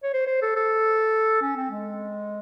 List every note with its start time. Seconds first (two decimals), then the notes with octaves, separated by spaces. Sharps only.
0.03 C#5
0.14 C5
0.27 C5
0.42 A4
0.56 A4
1.41 C#4
1.56 C4
1.71 G#3